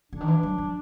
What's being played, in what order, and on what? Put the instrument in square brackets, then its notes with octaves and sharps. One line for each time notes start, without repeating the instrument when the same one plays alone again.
[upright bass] D3 [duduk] D4
[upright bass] D#3
E3
F#3
F3